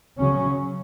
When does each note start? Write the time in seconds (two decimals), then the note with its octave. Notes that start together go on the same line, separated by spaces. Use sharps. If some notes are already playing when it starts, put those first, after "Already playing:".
0.17 C#3 F#3 C#4